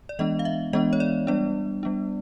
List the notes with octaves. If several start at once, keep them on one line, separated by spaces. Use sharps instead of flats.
D5
E3 G#3 B3 D4 D#5
F5
E5
E3 G#3 B3 D4 D#5
C#5
D5
G3 B3 D4 D5
G3 B3 D4